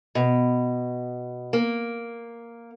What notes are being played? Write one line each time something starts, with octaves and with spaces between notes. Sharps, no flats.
B2
A#3